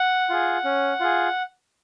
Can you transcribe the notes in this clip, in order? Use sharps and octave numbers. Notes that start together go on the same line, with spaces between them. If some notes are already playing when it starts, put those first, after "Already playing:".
Already playing: F#5
F4 G#4
C#4
F4 G#4